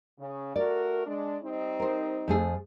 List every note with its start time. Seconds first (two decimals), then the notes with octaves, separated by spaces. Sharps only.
0.19 C#3
0.56 A3 F#4 A#4 D5
1.06 G#3 D4
1.43 G3 C4 D#4
1.80 A#4 C5
2.28 F2 A3 G#4